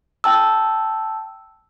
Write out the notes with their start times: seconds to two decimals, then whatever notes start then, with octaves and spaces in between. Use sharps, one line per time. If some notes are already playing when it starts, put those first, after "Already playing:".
0.24 G5 A5 E6